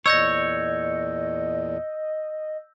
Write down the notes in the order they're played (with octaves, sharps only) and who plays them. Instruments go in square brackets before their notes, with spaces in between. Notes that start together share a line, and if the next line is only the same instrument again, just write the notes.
[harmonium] E2 A#2 [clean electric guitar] C#5 [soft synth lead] D#5 [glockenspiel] E6 G6 A#6